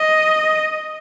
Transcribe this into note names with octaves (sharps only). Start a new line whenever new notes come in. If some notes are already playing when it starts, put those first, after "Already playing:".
Already playing: D#5